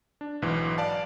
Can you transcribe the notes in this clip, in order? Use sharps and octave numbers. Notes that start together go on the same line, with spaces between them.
D4
B1 G#2 E3
D5 F5 A5